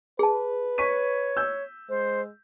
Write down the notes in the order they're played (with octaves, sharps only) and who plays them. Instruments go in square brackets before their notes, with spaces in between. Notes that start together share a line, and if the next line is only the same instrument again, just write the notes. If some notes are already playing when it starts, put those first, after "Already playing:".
[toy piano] G#4 A5 [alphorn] B4
[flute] C#5 [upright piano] C#6 B6 D#7
[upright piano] E6 G6
[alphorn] G#3 [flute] C5